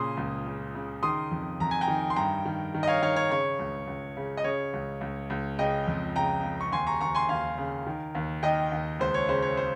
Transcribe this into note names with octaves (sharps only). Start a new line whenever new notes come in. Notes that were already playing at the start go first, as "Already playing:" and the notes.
Already playing: A#2 C#3 C6 D#6
C#2
C#3
C#3
D#3 C6 D#6
F2
F2 A#5
G#5
G5 A#5
D#3
C6
G2 G5 A#5
D#3
D#3
D#5
C#5 F5
D#3 C#5 F5
C#5
C#3 C#5
C#2
C#2
C#3
D#5
C#3 C#5
C#2
C#2
C#2
C#3 D#5 G5
F2
C#3 G5 A#5
C#3
C#6
D#2 G#5 C6
A#5 C#6
D#2 A#5 C#6
G#5 C6
D#2 F5 G#5
C#3
D#3
D#2
D#3 D#5 G5
D#2
C#2 C5
C#5
C#3 C5
C#5
C5